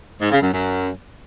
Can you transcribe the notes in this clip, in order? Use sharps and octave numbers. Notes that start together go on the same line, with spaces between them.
G#2
C#3
F#2
F#2